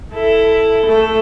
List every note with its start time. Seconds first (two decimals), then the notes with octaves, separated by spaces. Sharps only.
0.13 E4 A4
0.86 A3 A4